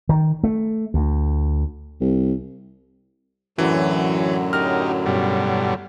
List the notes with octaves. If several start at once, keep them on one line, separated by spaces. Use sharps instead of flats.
D#3
A3
D2
C2
F#2 A2 D3 E3 F#3
D#4 G4 A#4 F6
G2 B2 G3